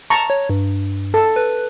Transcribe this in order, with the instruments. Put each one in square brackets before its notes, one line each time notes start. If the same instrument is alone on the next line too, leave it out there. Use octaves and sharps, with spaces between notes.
[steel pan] A5 A#5 C#6
[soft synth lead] C#5
G2
[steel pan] A4
[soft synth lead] B4